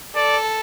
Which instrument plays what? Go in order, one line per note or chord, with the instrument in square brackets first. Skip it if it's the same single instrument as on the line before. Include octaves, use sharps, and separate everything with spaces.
[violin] A4 [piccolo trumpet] D5